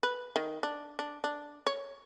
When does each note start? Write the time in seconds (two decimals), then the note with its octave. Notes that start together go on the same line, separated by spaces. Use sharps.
0.03 B4
0.36 D#3
0.63 D4
0.99 D4
1.24 D4
1.67 C#5